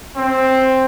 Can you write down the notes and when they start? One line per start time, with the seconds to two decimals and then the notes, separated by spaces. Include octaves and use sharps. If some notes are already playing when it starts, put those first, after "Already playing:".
0.16 C4